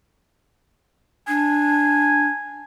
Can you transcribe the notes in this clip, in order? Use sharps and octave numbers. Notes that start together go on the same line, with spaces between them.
D4 G#5